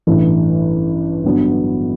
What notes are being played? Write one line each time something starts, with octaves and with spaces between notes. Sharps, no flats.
A1 G2 E3 A3
G1 G2 D3 F#3 B3